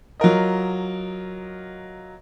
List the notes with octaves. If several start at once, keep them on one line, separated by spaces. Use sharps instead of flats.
F#3 F4 A#4 D#5